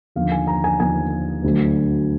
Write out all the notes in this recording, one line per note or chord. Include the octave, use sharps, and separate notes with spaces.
D#2 D3 F3 F5
G#5
A#5
G#5
D#2 D3 F3 G#5
D2 D3 F#3